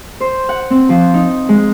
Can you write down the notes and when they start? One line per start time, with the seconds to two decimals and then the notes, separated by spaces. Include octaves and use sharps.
0.20 C5
0.49 F#5
0.71 C4
0.89 F3
1.14 D#4
1.49 G#3